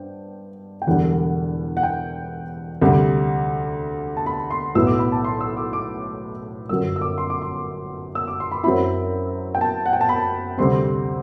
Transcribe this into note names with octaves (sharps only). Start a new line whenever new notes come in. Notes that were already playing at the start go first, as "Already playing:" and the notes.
Already playing: G2 C5 G5
G5
E1 E2 D3 G3 D4 F#5
F#5
G5
D2 C3 G3
A5
B5
C6
B1 A2 F#3 B3 E4 E6
D6
B5
A5
C6
E6
D6
D6
G1 F#2 F#3 E6
E6
D6
C6
D6
C6
E6
D6
C6
B5
F#2 F#3 C4 E4 B5
G5
A5
F#5
G5
A5
B5
D2 C3 G3 C4 C6